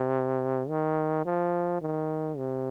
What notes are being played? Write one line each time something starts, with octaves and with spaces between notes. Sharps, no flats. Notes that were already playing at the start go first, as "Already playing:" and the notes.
Already playing: C3
D#3
F3
D#3
C3